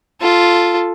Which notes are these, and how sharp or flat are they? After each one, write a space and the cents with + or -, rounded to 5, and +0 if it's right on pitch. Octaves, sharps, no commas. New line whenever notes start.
F4 +0 A4 +0